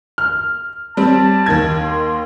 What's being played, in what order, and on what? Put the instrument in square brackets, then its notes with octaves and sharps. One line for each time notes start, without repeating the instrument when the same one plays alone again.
[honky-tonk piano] F6
[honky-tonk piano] G3 C4 [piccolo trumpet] A5
[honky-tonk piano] D#2 D#3 G#6
[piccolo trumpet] C6